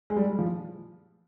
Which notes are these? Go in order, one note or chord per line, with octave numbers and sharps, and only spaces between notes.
G#3
G3
F3